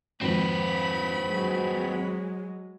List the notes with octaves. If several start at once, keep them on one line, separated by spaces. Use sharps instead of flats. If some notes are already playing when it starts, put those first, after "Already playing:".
G#1 F2 C4 B4 B5
F#3 G#3